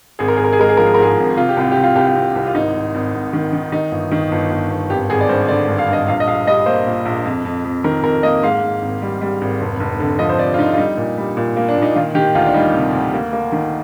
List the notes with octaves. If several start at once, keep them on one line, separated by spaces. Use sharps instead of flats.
G#1 G#4
A#4
G#1 G#4
A#4
G#4
G#3 A#4
G#4
F3 A#4
G#4
A#4
G#2 G#4
G#1
C3 F4
G4
C2 F4
C3 G4
F4
C2 G4
F4
C3
C2
F4
G#1 D#4
G#1
G#1
G#1
D#3
D#3
D#3 D#4
G1
D#3
G1
G1
G1
G#1 G4
G#1 G#4
D5
G2 C5
D3 D5
G2
F5
G2 D#5
A#1 F5
D#5
A#1 F5
G3 D#5
A#3 C5
A#2
A#1
F2
F2
F2
D#3 A#4
F2 A#4
A#3 D#5
G#2 F5
G#2
G#1
G3
G3
G#1
F1
F1
D3
F3 D#5
C5
F1 D5
F4
D3 D#4
F4
G3 D#4
A#2
G3
A#2
A#3
D4
A#2
D#4
D#3 F4
D#3 G4
D2 F4
D4
G3 D#4
C3
D2
A#3
A#3
D#3